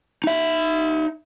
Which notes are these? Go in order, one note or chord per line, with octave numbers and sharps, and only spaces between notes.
D#4 E5